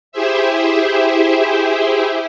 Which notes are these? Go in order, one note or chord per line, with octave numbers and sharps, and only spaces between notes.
E4 G4 G#4 C5 E5